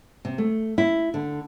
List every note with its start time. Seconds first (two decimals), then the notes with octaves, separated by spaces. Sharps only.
0.25 C3
0.38 A3
0.78 E4
1.14 D3